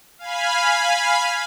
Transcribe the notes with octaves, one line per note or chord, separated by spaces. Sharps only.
F5 G#5 B5